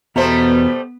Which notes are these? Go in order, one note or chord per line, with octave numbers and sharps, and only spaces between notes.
E2 B2 G3 A3 B3 C5 A#5